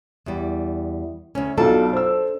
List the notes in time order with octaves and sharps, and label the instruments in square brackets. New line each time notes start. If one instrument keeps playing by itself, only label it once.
[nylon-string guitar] E2 G3
D2 C#4
[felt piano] B1 F4 [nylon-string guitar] D4 A4
[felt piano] C5 E6